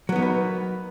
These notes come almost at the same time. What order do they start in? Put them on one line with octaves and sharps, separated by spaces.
F#3 B3 D#4 A#3 B4